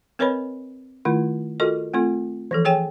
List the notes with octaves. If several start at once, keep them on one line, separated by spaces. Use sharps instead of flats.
C4 A#4 B4 C#5 D#5 B5
D#3 A3 E4 F4
F4 F#4 A4 A#4 D#5
A3 C4 F4 A4
E3 F3 A4
G#4 C#5 G5 G#5